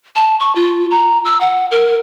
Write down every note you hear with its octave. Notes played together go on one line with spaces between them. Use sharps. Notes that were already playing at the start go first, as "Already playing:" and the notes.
A5
C#6
F4
A#5
E6
F#5
A#4